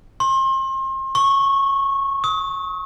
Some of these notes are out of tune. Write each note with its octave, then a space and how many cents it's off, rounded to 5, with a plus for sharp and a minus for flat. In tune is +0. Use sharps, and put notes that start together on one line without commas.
C6 +35
C#6 -15
D#6 +40